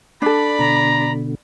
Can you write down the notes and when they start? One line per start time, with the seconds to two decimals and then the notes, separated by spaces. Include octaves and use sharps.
0.22 D4 A4 D5 B5
0.59 B2 D3 A#5